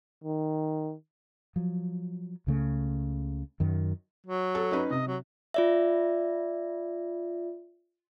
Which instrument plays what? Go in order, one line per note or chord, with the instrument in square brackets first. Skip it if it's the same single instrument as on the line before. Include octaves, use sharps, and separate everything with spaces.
[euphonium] D#3
[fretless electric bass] F3 F#3
C#2 C#3 A3
F#2 D#3
[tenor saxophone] F#3
[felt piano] A4
C#4 D#4 B4
[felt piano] C3 [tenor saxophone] D#5
[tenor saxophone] F#3
[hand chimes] F4 D5 E5